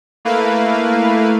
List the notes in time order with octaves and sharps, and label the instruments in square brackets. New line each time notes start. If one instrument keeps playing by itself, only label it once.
[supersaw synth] A3 A#3 E4 B4 F5